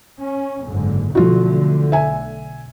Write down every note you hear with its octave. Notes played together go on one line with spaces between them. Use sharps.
C#4
F#1 G#2 D3
B1 D3 F3 A3 F4 F#4
E5 G#5